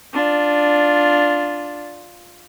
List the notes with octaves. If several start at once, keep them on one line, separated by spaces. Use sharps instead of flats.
D4 F4